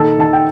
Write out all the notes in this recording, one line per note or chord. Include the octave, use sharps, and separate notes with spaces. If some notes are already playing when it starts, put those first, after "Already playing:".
Already playing: A#2 D#3 A4 A5
D#3 A5
G5